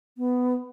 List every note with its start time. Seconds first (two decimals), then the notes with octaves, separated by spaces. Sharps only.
0.18 B3